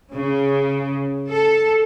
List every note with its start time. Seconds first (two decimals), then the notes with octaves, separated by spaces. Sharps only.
0.13 C#3
1.28 A4